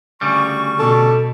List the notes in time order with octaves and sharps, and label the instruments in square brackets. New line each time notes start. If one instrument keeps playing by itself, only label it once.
[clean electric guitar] D2 C#3 G3 [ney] C#6
[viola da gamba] B2 [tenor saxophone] A4